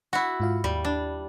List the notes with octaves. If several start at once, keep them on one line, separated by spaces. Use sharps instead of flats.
E4 F#4 F#5
G#2 F4 F5
D#2 G3
D4